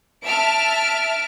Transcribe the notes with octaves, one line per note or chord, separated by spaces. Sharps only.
E5 A5 F6 D7